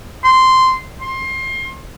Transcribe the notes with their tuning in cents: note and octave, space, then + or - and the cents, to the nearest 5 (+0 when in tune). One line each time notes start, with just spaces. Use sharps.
C6 -10
C6 +25